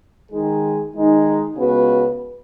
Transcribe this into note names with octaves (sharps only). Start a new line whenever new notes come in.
D#3 G#3 D#4 G#4
D#3 G#3 D#4 G#4
C#2 C#3 B3 F#4 B4